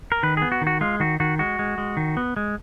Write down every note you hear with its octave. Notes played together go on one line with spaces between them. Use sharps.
A#4
D#3 B4
B3 G#4
F#4
D#3
F#4
G#3 F4
D#3 F#4
D#3 F#4
G#3 F#4
G#3
G#3
D#3
B3
G#3